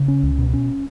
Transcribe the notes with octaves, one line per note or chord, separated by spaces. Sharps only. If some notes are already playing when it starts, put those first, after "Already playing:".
Already playing: C#3
C#4
C#2
B2
C#4